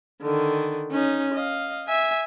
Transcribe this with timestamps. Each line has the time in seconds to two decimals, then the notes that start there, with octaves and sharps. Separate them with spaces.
0.22 D3 D#3
0.91 C#4 D#4
1.34 D#5 F5
1.87 E5 G#5